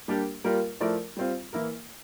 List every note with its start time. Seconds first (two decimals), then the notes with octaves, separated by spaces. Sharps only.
0.08 G3 A#3 D4 G4
0.44 G3 A#3 F4 A#4
0.80 F3 A3 E4 A#4 D5
1.17 G3 C4 F4
1.53 E3 A#3 E4 A#4